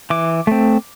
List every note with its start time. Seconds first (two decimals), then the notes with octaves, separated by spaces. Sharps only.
0.10 E3 D6
0.47 A3 C4